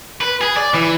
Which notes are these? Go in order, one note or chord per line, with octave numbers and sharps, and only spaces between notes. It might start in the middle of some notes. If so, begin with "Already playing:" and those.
B4
G#4
D5
E3